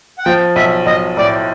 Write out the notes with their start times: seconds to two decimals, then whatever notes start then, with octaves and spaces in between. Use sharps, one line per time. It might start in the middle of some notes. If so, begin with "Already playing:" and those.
0.18 F#5
0.25 F3 G5
0.56 B1 E5
0.86 B1 D#5
1.17 A2 D5